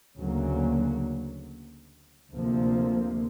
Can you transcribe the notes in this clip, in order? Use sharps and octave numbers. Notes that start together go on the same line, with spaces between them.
D2 C#3 F#3 A#3
D2 C3 F3 A#3